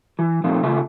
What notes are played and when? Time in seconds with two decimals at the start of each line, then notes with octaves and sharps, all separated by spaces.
0.19 E3
0.44 A#2 F3 A3 C4 D#4
0.63 C#3 A3 F4 E5